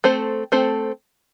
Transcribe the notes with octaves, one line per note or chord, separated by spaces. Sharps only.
A3 C4 A4 C5
A3 C4 A4 C5